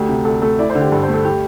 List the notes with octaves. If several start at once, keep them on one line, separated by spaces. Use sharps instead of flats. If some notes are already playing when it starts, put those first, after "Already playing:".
Already playing: D2 A3 G4
C3
D2 A4
A3 A4
E4 D5
C5
D3
G4
G2 A4
C5
A3
A4
G4